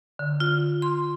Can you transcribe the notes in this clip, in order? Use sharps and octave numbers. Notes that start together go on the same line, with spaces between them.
D3
F4
C6